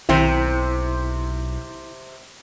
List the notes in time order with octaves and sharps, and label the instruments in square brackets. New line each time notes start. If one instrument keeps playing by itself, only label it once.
[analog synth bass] B1 [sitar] C3 C5 [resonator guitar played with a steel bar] D#3 C4 E5 [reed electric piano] E4